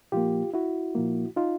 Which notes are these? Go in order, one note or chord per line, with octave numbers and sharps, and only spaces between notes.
A#2 F3 A#3 F4 G4
E4 F#4
A#2 F3 A#3
D#4 F4